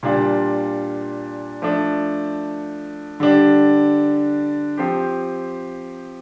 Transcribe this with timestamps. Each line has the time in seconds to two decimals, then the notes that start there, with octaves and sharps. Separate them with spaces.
0.03 A#2 G3 D4 F4
1.62 F3 A3 D4
3.20 D3 G3 D4
4.77 F3 C4 G4